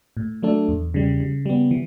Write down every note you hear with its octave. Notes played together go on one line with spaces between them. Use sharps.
A2
F#3 A3 D4 A4
E2
C#3 G3
C#3
G3 B3
E3